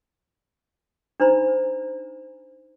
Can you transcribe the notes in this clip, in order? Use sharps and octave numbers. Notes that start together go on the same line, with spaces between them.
D4 D#4 C5 A#5 B5